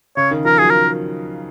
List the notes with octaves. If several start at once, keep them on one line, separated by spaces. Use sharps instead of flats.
C#3 C#5
D#3
F3 A#4
F#3 G#4
A#4